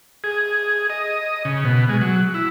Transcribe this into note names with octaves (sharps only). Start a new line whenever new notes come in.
G#4
D#5
C#3
B2
G#3
F#3
E4